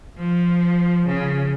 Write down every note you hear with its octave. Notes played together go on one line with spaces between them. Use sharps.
F3
C#3